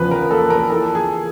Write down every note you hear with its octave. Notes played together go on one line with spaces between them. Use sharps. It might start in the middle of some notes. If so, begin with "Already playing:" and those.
Already playing: E2 C#3 F3 B4
A#4
A#3 A4
A#4
E3 A4
G#4